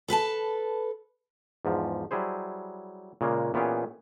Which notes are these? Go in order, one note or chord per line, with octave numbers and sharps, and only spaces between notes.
A4 B4 G#5 A5
E2 G#2 F3
F#3 G3 E4 G#4 C5
A#2 C#3 G#3 A#3
A#2 E3 B3 C#4 G4 G#4